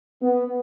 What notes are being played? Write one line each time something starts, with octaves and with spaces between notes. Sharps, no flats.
B3